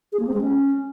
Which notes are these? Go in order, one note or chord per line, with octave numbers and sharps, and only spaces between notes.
G#4
A#3
C4
G#3
C#4